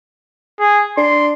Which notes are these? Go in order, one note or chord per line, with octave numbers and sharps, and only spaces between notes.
G#4
D4 C6